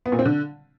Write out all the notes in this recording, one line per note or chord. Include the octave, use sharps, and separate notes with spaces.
B3
A#2
C4
D3